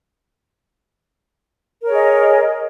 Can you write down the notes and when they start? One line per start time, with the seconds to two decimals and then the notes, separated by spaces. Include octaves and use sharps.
1.82 A#4
1.86 C#5
1.90 G#4
1.94 D#5